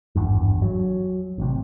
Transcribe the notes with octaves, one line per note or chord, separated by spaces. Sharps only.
G#1 E2 G2
F#3
A1 C3